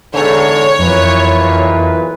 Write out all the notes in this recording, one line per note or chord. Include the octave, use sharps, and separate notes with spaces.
E2 G#2 D3 C#5
B1 F2 A#2 E3 B4